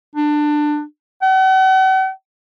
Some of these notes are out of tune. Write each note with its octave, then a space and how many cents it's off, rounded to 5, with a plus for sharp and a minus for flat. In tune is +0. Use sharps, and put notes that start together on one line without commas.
D4 +20
F#5 +45